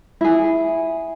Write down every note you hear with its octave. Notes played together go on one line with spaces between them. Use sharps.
E4 G#4